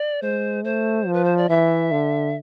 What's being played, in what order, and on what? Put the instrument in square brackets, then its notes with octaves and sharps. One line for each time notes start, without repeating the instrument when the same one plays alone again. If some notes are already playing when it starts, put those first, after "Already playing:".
Already playing: [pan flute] D5
[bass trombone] G#3 [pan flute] C5
[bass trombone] A3 [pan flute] C5
[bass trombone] F3
[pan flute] B4
C5
D5
[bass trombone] E3 [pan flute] E5
[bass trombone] D3